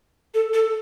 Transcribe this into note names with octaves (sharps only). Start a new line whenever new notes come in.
A4
A4